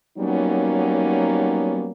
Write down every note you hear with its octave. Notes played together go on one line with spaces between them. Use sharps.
F#3 G3 A#3 B3 C#4 D#4